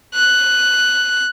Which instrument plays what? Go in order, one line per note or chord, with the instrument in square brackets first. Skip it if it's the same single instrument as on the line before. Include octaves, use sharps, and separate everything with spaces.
[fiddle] F#6